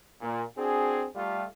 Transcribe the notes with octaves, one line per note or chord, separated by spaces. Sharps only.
A#2
C4 D4 F#4 G#4
G3 A3 F4